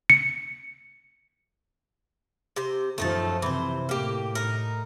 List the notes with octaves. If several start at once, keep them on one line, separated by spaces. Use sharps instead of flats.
C#7
C3 C5
F#2 F3 A3 D#4 A5
C3 E3 C5
A2 A#3 G4
D#4 A#4